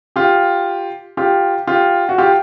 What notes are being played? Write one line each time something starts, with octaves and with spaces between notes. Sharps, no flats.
F4 G4
F4 G4
F4 G4
F#4
F4 G4